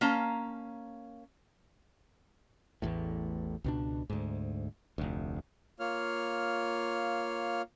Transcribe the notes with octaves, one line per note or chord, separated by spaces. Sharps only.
A#3 C#4 F5 A5 A#5
A1 E2 A2
C#2 B2 D4
D2 G#2
F1 D2
A#3 F4 C#5 F6